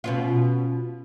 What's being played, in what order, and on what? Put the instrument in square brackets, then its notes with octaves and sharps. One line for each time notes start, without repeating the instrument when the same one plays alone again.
[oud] B2 C#4 F4